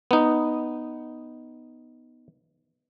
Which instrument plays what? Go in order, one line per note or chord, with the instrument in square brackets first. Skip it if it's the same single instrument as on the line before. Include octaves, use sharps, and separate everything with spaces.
[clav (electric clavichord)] B3 D#4